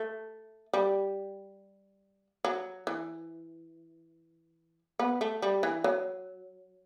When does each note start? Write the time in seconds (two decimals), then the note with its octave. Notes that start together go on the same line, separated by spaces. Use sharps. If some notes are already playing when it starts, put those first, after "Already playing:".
Already playing: A3
0.73 G3
2.45 F#3
2.87 E3
4.99 B3
5.21 A3
5.42 G3
5.63 E3
5.84 F#3